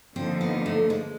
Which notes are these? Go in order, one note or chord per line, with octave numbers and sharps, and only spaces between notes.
D3 F3 A#3 C4 D#4
B3
A3
G#3